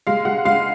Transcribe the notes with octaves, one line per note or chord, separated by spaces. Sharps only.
G#3 F5
G#3 F#5
G#3 F5